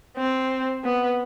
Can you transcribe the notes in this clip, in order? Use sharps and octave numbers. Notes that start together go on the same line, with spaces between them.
C4
B3